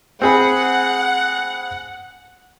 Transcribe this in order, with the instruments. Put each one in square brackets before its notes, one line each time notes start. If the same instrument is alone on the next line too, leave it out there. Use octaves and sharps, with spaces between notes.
[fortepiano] C4 G#4 B5 [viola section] F#5